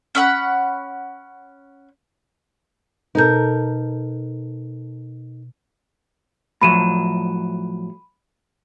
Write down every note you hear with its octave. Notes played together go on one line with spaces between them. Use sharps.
C#4 E5 F#5 B5
B2 D#4 A4 A#4 G6
A2 F3 F#3 B5 D#7 E7